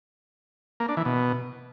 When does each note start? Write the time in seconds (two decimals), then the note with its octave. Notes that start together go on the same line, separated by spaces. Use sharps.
0.80 A#3
0.88 D4
0.97 E3
1.05 B2